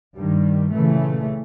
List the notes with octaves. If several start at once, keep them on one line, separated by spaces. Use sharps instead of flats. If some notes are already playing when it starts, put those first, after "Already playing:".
G2 D#3 G3
A#2 C#3 E3 A3